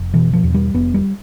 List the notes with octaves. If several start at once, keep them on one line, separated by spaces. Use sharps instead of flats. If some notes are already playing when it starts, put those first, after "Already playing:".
Already playing: F1
B2 E3
F3
E2
G3
F1 B3
G3